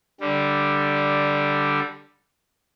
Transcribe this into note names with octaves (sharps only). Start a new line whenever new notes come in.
D3 G3